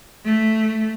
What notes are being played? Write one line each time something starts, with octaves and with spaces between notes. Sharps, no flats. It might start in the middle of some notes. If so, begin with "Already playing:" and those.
A3